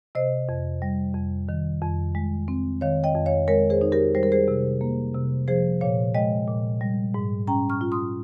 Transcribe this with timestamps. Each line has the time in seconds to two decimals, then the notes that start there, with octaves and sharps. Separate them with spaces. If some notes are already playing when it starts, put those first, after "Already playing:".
0.15 C3 C5 D#5
0.49 F2
0.82 G3
1.15 F2
1.49 D#3
1.82 F2
2.15 G#3
2.48 C4
2.81 D#3 C#5 F5
3.04 D#5 G5
3.15 F2
3.26 C#5 F5
3.48 G#3 A#4 C#5
3.70 G#4 C5
3.81 D#4
3.92 G4 A#4
4.15 G3 C5
4.23 A#4
4.32 G#4 C5
4.48 C3
4.81 A#3
5.14 C3
5.48 F3 G#4 C5
5.81 A#2 C#5 F5
6.14 G#3 D#5 G5
6.48 A#2
6.81 G3
7.14 G#2
7.47 C#4 G5 A#5
7.69 C#6 F6
7.81 F4
7.92 C6 D#6